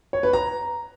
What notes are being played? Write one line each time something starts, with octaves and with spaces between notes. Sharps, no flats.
C#5
B4
A#5